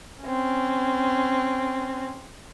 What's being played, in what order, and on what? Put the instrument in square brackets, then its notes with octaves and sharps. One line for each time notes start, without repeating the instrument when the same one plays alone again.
[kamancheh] C4 C#4